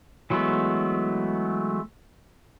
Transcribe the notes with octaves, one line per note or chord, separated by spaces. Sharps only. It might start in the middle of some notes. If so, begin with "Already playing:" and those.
E3 F#3 G#3 A3 B3